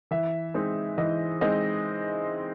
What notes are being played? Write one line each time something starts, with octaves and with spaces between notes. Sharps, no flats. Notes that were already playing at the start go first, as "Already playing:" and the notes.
E3 E5
G#3 C4 D#4
E3 D#5
G#3 C4 D#4 D#5